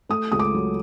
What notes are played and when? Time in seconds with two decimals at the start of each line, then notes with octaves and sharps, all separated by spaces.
0.09 A3 D#6
0.32 C#2 D#6
0.39 D6
0.54 F#3